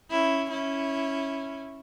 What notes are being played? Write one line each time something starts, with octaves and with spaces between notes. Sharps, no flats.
C#4 E4
C#4 E4